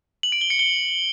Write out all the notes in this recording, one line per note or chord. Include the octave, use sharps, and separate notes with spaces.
F#7
D7
G7
C#7
G7